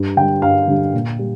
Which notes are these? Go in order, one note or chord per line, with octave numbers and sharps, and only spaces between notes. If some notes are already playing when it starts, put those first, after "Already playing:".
Already playing: G2
D3 G3 G5
G2 F5
D3 G3
A#2
G3